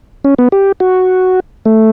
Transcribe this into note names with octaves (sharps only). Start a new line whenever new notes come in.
C#4
B3
G4
F#4
A3